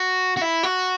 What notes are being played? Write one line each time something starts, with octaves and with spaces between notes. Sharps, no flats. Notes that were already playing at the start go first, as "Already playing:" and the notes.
Already playing: F#4
F#4
E4
F#4